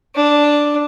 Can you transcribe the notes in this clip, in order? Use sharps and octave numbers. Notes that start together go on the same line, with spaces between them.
D4